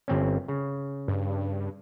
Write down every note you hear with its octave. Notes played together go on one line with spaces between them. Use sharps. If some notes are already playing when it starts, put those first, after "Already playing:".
G1 C4 C#4
C#3
G2